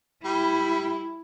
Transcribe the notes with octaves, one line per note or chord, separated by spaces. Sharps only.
G3 E4